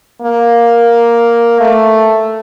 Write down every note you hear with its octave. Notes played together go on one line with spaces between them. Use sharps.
A#3
A3